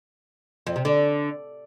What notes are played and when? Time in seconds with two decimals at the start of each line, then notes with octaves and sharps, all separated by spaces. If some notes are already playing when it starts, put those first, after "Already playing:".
0.67 F2
0.76 C3
0.85 D3